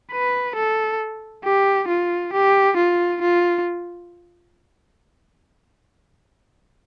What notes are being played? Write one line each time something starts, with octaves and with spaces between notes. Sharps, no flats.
B4
A4
G4
F4
G4
F4
F4